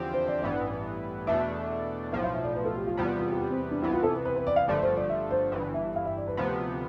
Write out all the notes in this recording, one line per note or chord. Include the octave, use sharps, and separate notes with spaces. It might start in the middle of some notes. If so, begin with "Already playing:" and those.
Already playing: E2 D3 F3 C4 G4
C5
D5
A1 G2 E3 B3 D5
E2 B2 A3 D4 E5
B1 A2 F3 F5
F5
E5
D5
B4
A4
G4
F4
E2 C3 G3 B3 F4
F4
F4
G4
C4
D4
C2 C3 E3 B3 E4
F4
A4
B4
B4
B4
D5
F5
G1 G2 D3 F3 A3 D5
C5
D5
E5
C5
G1 G2 E3
E5
F5
E5
D5
B4
D2 C3 F3 B3